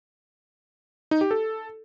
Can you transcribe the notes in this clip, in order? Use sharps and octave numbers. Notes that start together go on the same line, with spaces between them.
D#4
G4
A4